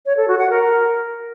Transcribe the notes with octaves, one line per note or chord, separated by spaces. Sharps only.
C#5
A4
F#4
F#5
A#4